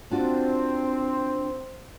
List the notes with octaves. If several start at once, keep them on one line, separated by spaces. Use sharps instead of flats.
C4 D4 F4 F#4